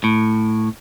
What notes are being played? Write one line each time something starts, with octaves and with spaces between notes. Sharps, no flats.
A2